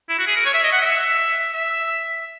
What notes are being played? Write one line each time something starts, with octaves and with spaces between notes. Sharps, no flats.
E4
F#4
G#4
A#4
C#5
E5
D#5
F#5
E5
E5